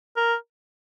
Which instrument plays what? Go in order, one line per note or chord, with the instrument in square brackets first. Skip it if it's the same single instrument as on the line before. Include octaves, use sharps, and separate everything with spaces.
[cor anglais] A#4